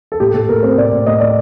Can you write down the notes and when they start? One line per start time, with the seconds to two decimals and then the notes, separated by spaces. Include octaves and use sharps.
0.12 A4
0.20 A2 G4
0.34 A2 A4
0.49 A2 A#4
0.63 C4 C5
0.77 A2 D5
0.92 A2
1.06 A2 D#5
1.20 A2 D5